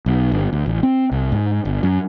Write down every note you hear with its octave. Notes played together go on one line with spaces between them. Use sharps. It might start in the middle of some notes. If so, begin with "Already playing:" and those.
B1
G1
D2
A1
C4
C2
G#2
G1
F#2